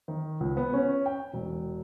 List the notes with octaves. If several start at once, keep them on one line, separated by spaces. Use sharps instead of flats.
D#3
C#2
B3
C#4
G5
E1